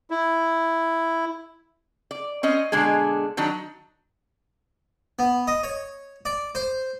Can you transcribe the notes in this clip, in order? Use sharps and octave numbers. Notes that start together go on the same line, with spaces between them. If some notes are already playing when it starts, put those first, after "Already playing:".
E4
D5
C4 C#4 D#5
B2 D3 G#3 D4 G#4
D#3 F#3 D4
B3
D#5
C#5
D5
C5